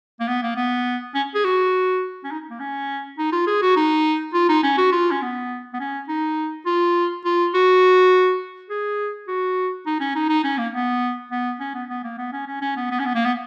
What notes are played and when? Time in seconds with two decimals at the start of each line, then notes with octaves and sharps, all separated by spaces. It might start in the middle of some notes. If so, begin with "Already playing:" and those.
0.20 A#3
0.28 B3
0.43 A#3
0.57 B3
1.15 C#4
1.35 G#4
1.45 F#4
2.24 C#4
2.32 D#4
2.50 A#3
2.60 C#4
3.19 D#4
3.33 F4
3.47 G#4
3.62 F#4
3.77 D#4
4.34 F4
4.49 D#4
4.64 C#4
4.78 F#4
4.92 F4
5.12 C#4
5.22 B3
5.74 B3
5.80 C#4
6.09 D#4
6.66 F4
7.25 F4
7.54 F#4
8.70 G#4
9.28 F#4
9.87 D#4
10.01 C#4
10.16 D#4
10.29 D#4
10.44 C#4
10.58 A#3
10.73 B3
11.32 B3
11.60 C#4
11.75 B3
11.90 B3
12.04 A#3
12.18 B3
12.33 C#4
12.47 C#4
12.62 C#4
12.77 B3
12.91 B3
13.00 C#4
13.06 B3
13.15 A#3
13.25 B3